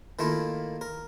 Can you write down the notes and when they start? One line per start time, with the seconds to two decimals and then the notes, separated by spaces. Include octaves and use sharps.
0.19 D#3 A3 A#3 E4 F4
0.81 A#4